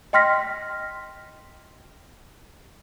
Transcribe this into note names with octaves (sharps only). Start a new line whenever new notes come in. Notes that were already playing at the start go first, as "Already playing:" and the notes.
D#5 G5 C6 F6 A#6 B6